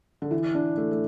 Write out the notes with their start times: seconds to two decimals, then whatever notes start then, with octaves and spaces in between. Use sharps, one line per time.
0.22 D3
0.31 E3
0.55 D4
0.78 A3
0.91 A3